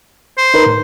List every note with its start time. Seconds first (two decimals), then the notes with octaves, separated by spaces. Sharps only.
0.38 C5
0.54 D#4 A#4 B4
0.66 A2